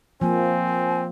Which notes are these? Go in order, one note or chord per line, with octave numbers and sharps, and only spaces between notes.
F3 A#3 C4 G#5